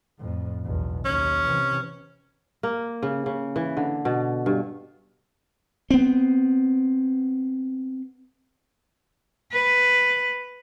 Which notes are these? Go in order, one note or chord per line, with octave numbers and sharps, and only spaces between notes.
F2 A2
B1 E2
D#2 C#4
C3 E3
A#3
C#3
C#3
E3
D3
B2
G2
B3 C4
B4